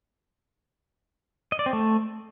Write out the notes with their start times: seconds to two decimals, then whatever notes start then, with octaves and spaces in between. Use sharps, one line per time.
1.52 D#5
1.59 D5
1.66 C4
1.73 A3